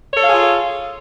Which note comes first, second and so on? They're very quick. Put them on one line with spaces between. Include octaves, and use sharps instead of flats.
C#5 A4 F5 G#4 F4